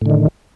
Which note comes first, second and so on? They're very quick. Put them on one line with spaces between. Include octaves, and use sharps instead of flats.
A2 D3 D#3